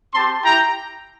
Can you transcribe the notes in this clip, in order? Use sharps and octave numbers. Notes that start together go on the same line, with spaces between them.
C4 G4 A5 C6
E4 G4 G5 A#5